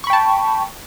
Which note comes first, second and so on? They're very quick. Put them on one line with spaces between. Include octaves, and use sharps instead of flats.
C#6 B5 G5 A5